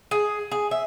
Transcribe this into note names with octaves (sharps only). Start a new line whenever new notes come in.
G#4
G#4
E5